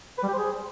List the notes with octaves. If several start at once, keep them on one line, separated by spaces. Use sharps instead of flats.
B4
G3
G4
C5
G#4